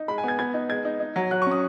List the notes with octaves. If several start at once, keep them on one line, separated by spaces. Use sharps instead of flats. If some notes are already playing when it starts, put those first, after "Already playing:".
Already playing: D#4
G#3 B5
G#5
B3 G#6
B3 G#6
D#4
G#3 G#6
D#4
D#4
F#3
F#3 F#6
C#6
C#4
D#6